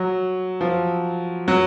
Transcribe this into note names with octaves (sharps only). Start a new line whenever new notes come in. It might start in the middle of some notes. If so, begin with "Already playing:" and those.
Already playing: F#3
F3
F#3